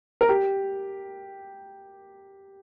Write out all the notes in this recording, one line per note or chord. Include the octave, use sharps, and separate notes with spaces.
A#4
G4